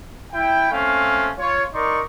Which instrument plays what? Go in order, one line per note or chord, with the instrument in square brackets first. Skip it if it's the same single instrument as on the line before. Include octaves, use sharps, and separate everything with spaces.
[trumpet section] E4 G5
A3 C4 C#4 F5
F4 C#5
D#4 A#4 D5 C6 C#6